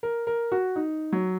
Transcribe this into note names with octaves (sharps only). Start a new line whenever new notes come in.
A#4
A#4
F#4
D#4
F#3